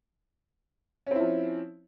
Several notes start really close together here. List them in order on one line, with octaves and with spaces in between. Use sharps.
C#4 C4 E4 F3